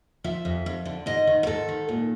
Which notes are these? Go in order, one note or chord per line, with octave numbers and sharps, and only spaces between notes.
F3 E5
F2
F2
D3
G#2 D#5
D#3
A#4
G#2 A4
D#3
A#2